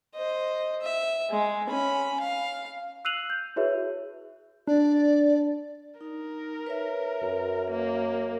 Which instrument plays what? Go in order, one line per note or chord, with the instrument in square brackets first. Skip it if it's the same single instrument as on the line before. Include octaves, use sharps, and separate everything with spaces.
[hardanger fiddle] C5 D#5
E5
G#3
C#4 B5
F5
[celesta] E6 F#6 C7 D#7 F7 F#7
G6
E4 F#4 G#4 B4 C#5 E5
[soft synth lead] D4 [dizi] D5
[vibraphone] D#4 [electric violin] A#4
[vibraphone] B4 C#5 E5
[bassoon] F#2
[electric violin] A#3